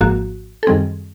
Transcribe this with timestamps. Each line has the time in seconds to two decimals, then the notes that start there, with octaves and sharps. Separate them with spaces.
0.01 G#1 G#2 F3 A#3 F#4
0.63 A4
0.67 F#2 D#3 G3 C4 G#4